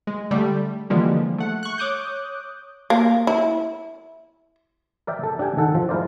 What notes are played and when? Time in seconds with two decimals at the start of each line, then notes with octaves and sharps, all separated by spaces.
0.07 G#3
0.31 D3 G3 A3
0.90 D3 E3 F3 G3 G#3 A#3
1.38 A3 F#5
1.63 C#6 F#6
1.78 C#5 D6 D#6 F#6 G6
2.90 A#3
3.27 E4
5.07 A#4 D5 E5 G5
5.24 A4
5.39 D4 G4 G5 G#5
5.57 D#3 A4 F#5
5.75 F3
5.89 G#3 E4 A#4 C5 D5